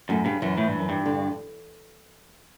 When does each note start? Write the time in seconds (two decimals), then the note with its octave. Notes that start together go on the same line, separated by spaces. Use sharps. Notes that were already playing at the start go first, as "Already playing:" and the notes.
0.09 F#2 A2
0.25 G2 C#3
0.42 F#2 E3
0.58 A2
0.68 G2
0.79 F#2
0.89 G2
1.06 D3